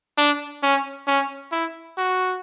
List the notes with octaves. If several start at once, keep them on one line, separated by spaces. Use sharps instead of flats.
D4
C#4
C#4
E4
F#4